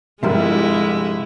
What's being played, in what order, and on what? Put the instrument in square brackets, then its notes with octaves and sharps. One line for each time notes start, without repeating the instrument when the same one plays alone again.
[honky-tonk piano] G1 G3 E5 [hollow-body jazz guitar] C3 F3 A#4 [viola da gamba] G#3 E4